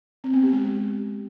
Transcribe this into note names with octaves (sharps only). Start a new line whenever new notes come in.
C4
B3
G4
G#3